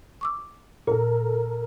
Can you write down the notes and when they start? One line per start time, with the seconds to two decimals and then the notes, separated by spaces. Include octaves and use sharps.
0.21 C#6 D6 E6
0.87 A#2 A4 A#4